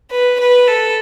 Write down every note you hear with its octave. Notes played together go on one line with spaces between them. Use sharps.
B4
B4
A4